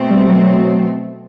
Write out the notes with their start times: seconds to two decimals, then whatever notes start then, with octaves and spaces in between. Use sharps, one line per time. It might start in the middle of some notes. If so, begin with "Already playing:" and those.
Already playing: B2 A3 C4
0.10 G3
0.28 F#3